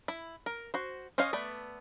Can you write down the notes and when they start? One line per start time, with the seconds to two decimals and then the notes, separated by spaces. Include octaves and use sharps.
0.08 E4
0.46 A#4
0.74 F#4 C5
1.18 C#4 C5 C#5 D#5 F5
1.33 A3 B3 D5